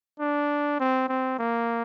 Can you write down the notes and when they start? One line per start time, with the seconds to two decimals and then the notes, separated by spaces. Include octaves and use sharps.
0.20 D4
0.80 C4
1.09 C4
1.39 A#3